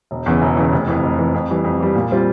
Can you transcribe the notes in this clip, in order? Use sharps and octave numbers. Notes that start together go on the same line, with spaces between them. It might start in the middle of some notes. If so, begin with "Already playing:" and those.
E1
E2 C#3 E3
E1
E2 C#3 E3
F1
F2 E3
F1
F2 E3
F2
E3 G3
F2
E3 G3
A#2
G3 C4 F4